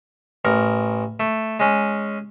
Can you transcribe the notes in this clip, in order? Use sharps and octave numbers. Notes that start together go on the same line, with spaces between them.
A1 A#4 C#6
A3
G#3 C#4